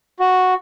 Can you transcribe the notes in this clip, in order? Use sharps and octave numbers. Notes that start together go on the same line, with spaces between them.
F#4